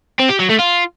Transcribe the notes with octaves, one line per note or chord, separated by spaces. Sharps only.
C4
G4
F#3
A3
F4